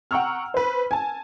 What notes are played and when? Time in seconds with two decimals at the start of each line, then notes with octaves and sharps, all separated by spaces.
0.11 F#5 G5 A#5 C#6 E6 F6
0.54 B4 C5
0.91 G#5 A5